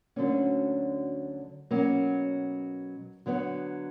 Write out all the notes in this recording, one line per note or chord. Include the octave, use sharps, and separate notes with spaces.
D2 D3 F#3 A#3 C#4
B2 F#3 A#3 C#4
D3 F#3 B3